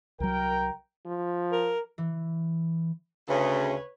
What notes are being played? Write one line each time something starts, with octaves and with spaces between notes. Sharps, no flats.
C2 F#3 A#4 G5
F3
A#4
E3
D2 C#3 B4 C#5